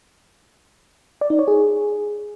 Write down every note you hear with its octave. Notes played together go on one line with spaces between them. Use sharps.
D5
D#4
C#5
G#4